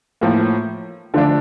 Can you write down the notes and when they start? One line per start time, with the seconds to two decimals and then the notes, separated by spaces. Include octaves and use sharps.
0.21 A2 F3 A#3
1.14 D3 F3 A3 D4